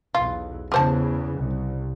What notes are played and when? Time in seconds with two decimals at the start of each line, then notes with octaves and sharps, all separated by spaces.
0.15 B1 E2 F4
0.72 E2 C#3 G4 C5 A5
1.36 C2